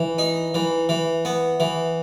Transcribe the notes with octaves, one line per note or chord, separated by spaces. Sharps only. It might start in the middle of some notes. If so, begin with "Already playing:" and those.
Already playing: E3
D#4
E3
E3
B3
E3